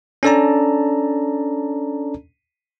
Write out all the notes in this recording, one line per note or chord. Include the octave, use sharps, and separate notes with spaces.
C#4 D4 A4 D5 A5 A#5